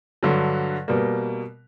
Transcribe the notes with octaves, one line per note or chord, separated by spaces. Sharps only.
G2 D3 F#3
B2 G3 A#3